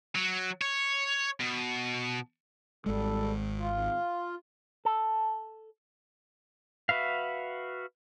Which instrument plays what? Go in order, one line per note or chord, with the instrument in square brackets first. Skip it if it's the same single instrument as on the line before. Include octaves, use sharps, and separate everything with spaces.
[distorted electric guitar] F#3
C#5
B2
[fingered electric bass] G#1 G#3 [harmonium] G3 A4
[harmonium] F4
[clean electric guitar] A4
[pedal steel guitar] F#4 B4 E5 F5